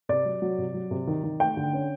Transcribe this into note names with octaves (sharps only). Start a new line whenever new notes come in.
C3 D5
F#3
F#3
C3
F#3
C3
D#3
D#3
A3 G5
D3
C#4